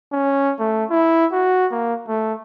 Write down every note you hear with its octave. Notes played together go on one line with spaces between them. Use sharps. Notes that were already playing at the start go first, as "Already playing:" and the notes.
C#4
A3
E4
F#4
A#3
A3